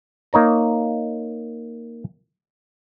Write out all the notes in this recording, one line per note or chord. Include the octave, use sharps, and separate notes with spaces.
A#3 D#4 C#5 A#5